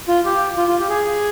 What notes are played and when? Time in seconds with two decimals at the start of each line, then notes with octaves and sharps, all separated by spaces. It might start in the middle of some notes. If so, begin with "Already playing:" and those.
0.08 F4
0.25 G4
0.57 F4
0.68 F4
0.79 G4
0.89 G#4